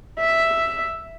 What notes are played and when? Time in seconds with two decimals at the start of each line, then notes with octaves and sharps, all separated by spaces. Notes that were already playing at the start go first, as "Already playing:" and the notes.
0.19 E5